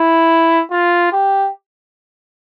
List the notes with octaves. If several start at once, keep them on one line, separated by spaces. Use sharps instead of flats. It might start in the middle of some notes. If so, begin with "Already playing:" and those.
Already playing: E4
F4
G4